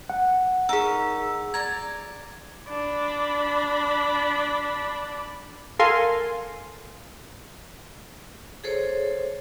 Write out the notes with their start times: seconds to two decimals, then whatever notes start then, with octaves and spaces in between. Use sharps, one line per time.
0.10 F#5
0.69 D#4 G#4 A#4 E6
1.54 D5 A#5 G#6
2.68 D4 B5
5.79 A4 A#4 F5 G#5 C6
8.64 G#4 A4 C5 C#5